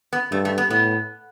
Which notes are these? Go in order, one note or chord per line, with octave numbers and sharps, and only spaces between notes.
B3
G2 A3
A3
B3
A2 B3